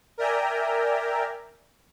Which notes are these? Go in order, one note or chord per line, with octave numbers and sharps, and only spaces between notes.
A#4 D5 E5 G5 G#5 A#5